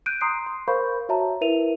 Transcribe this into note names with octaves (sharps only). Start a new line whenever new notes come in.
F#6 G6 D7 D#7
A#5 C6 D#6 C7 D7
C6
A#4 C5 F5 B5 C#6 G6
F#4 C#5 E5 A5 A#5
E4 A#4 B4 E5 D#7 F7